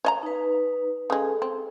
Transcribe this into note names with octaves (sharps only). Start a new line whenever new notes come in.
C#5 D#5 A#5
D#4 B4
C#3 G#3 G#4 A4
C4